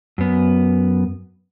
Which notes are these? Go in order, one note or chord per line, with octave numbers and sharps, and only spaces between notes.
F#2 B3